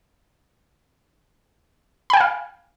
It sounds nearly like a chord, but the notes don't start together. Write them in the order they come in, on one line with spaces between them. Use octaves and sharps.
B5 G5 G#5 F5